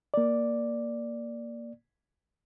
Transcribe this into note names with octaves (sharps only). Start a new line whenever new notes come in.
A#3 D5